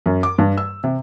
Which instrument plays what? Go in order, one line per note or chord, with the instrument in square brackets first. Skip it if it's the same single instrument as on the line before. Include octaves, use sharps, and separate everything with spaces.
[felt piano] F#2
D6
G2
E6
C3